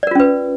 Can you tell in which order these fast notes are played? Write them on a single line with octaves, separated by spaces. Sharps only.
D5 A#4 F4 C#4 B4